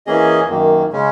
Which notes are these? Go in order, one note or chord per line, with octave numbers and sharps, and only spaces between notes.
E3 A#3 C#4 G#4 D#5
F#2 D#3 A#3
C#3 G#3 C#4